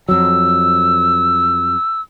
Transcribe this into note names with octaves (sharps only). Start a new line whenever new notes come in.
F2 F#3 E6